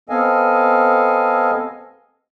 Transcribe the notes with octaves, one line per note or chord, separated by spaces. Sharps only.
B3 C4 A4 D#5 F5 G#5